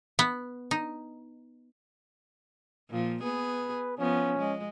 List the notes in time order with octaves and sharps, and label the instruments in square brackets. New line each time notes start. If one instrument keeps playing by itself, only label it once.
[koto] B3
D#4
[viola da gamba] A#2 F3
[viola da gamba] B3 G#4 [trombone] B4
[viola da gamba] F3 B3 [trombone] C#4
[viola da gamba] G#3